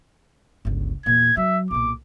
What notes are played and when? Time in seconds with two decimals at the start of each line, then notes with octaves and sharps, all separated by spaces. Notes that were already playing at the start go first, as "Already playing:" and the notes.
0.65 G1 C#2
1.06 E2 A#2 G#6
1.37 F#3 E5
1.71 B1 A#2 D6